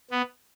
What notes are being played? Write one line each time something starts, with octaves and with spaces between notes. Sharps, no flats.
B3